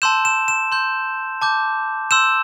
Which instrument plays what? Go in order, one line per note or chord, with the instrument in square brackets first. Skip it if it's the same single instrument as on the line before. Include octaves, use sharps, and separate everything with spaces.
[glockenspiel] A5 C6 E6 G6 E7
E7
E7
C6 G6
A5 D6 G6
C6 E6 G6 E7